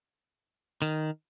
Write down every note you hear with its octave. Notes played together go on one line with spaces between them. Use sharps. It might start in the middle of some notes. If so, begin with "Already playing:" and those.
D#3